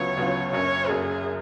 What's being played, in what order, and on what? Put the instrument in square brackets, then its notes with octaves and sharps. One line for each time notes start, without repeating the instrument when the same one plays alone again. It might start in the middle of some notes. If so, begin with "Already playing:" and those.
Already playing: [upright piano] D2 C#3 F#3 B3 F4 [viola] C#5
[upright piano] D2 C#3 F#3 B3 F4
[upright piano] F#1 F#2 C#3 [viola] C#5
[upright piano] F#1 F#2 C#3 [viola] G#4